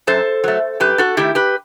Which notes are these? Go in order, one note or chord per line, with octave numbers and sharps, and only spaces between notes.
F#2 A4 C5
F#3 A3
F#2 G4 B4
F#4 A4
D#3 A3 E4 G4
G4 B4